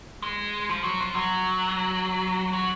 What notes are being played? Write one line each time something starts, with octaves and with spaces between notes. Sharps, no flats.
G#3
F3
F#3
F3
F#3
F#3